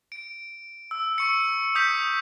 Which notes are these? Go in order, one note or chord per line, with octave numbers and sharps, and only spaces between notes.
D7
E6
C#6 C#7
D#6 G6 B6